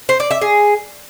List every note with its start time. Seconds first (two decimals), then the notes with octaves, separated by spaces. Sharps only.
0.09 C5
0.20 D5
0.31 E5
0.41 G#4